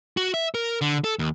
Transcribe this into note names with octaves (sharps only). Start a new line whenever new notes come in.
F#4
E5
A#4
D3
A4
D#2